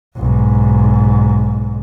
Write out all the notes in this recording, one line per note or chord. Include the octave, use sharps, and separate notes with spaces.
B1 G#2